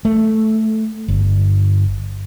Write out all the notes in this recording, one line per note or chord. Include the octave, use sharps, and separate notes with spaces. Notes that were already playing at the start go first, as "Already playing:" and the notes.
A3
G1